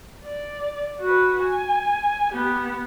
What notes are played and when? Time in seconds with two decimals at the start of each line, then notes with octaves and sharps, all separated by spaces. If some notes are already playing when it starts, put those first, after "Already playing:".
0.23 D5
1.01 F#4 B4
1.42 G#5
2.33 B3 G4